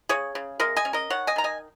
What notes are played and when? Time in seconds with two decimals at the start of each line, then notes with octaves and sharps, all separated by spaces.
0.09 C#3 G#4 C#5
0.35 C#3
0.60 G#3 A#4 D#5
0.76 D#5 G#5
0.85 C#4
0.93 A#4 D#5
1.10 D#3 C#5 F#5
1.27 D#5 G#5
1.36 D#3 A#5
1.44 D#5 G#5